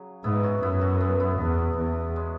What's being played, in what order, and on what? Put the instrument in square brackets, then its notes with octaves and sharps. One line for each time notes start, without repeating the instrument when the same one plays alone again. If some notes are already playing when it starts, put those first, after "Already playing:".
Already playing: [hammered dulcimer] C#3 F#3
[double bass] G#2 [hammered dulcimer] B3 E4
[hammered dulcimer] C#4 F#4
[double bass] F#2 [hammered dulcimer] B3 E4
[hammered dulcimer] C#4 F#4
B3 E4
B3 E4
[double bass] E2
E2
[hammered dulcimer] G#3 C#4